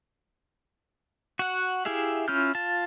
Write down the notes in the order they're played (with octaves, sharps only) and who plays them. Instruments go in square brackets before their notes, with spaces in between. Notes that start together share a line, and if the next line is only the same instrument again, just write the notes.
[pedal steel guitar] F#4 F#5
E4 G4 G#4 E5 F5
C#4 E4 F4 F6 G6
F4 A5